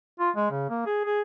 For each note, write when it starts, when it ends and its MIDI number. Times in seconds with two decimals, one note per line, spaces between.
0.20 0.30 65
0.36 0.48 56
0.50 0.66 49
0.70 0.81 58
0.86 1.02 68
1.05 1.21 68